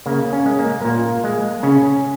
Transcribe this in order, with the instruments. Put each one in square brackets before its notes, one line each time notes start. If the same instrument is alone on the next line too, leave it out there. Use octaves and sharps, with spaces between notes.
[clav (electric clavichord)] C#3 A#3
C#4
G#3
A#3
A#2 A#3
G#3
C#3 C#4